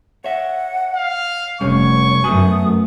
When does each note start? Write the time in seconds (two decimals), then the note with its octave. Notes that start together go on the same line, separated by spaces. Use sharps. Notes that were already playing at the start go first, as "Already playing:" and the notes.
0.24 C#5 E5 F#5
0.96 F5
1.61 F1 G3 C#4 C#5 C#6
2.24 F#2 A3 B3 F#4 G#5 D#6